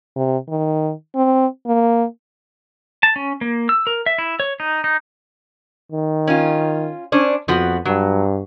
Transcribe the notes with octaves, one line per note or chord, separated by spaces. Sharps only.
C3
D#3
C4
A#3
A5
C#4
A#3
E6
A#4
E5
E4
C#5
D#4
D#4
D#3
C#4 F4
C#4 D4 C5
F2 F3 B3 F#4
G2 F#3